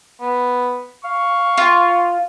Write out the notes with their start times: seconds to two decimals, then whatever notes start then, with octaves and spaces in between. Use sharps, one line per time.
0.21 B3
1.05 F5 C#6
1.58 F4